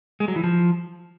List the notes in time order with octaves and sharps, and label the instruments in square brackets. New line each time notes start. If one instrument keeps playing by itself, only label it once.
[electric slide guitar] G#3
F#3
E3
F3